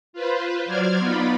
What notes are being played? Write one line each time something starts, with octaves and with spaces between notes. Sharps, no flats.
F4 B4 C5
F#3 C5 D5 F6 G#6
B3 D#4 F4 D5 B5